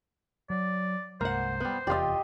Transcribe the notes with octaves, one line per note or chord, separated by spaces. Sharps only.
F#3 D5
C2 G2 G#3 A#3 C5 F#5
G3 B3
F1 E2 F4 G4 D5 D#5